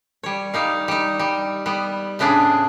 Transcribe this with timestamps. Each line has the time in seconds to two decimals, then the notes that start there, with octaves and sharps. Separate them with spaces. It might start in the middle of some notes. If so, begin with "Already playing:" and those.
0.23 G3 C#5
0.54 G3 D#4 F5
0.88 G3 D#4
1.19 G3
1.66 G3 B3
2.19 A2 C#3 B3 D4 G#4